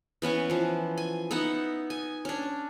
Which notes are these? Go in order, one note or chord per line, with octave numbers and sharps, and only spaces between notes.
E3 B3 C#4 C#6
E3 F3
G#5
B3 D#4 E5 F#5
G#5
C#4 D4